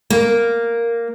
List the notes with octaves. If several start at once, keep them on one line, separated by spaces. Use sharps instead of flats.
A#3